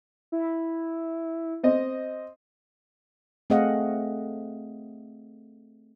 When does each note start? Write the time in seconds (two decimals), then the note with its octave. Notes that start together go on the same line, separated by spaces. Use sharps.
0.32 E4
1.63 C4 D#5
3.50 A3 C4 G#4 D#5 F5 F#5